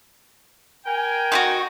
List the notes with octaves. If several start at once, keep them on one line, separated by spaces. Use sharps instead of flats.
A#4 G5 G#5
D#4 E4 F#4